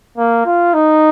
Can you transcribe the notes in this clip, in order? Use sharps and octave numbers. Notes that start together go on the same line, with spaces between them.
A#3
F4
D#4